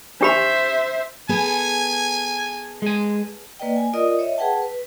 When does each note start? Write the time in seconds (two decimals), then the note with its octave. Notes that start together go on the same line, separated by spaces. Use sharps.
0.21 D4 G4 C5 E5 B5
1.29 B3 G#4 A4 G#5
2.82 G#3 G#5
3.60 A#3 B4 D5 D#5 G5
3.76 G#5
3.93 F4 A#4 D5 D#5 D#6
4.19 C#5 D#5 E5
4.38 G#4 B4 F#5 G5 A5
4.62 B4